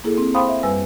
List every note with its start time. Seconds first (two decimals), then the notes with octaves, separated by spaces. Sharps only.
0.04 A#3 E4 G#4 A4
0.17 C4
0.34 C5 F5 G5 B5 C6 D#6
0.48 E5
0.63 F#2 G3 B4 G#5 E6